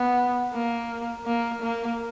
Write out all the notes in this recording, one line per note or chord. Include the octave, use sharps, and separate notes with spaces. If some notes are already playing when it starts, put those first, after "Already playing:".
Already playing: B3
A#3
A#3
A#3